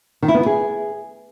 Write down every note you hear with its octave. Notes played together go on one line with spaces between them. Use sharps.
D#3
E4
B3
E4
G#4